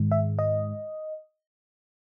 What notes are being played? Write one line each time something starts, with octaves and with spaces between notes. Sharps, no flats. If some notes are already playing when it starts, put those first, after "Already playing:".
Already playing: G#2 D#3 G#3
E5
D#5